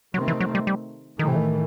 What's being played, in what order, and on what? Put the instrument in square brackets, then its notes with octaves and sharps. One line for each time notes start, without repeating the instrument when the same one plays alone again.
[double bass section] C3 D#3 A3 C4 [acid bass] F#3
[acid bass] E3
F#3
G3
G3
[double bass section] A2 E3 A3 [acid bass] D#3
[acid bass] C3
D#3